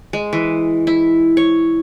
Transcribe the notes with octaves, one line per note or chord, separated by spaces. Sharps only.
G#3
E3
E4
C#5